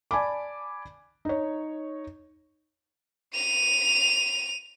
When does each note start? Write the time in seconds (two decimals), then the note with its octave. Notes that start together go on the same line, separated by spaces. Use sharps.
0.11 D5 G#5 A5 B5 D6
1.25 D#4 C#5
3.35 D#7 F7